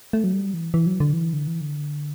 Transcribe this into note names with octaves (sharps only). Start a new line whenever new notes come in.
A3
F#3
G3
E3
E3
F#3
D3
E3
D3
E3
D3